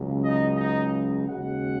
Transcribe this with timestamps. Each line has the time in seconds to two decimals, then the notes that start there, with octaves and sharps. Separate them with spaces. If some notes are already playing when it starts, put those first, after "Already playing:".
Already playing: C#2 C#3 F#3
0.23 D#4 D#5
0.57 D#4 D#5
1.28 D#2 C#3 G#3 F#4 F#5